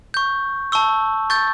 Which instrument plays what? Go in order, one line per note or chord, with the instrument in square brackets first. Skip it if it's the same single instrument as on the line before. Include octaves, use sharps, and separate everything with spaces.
[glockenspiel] C#6 G6
A5 C#6 E6
C#6 G6 A6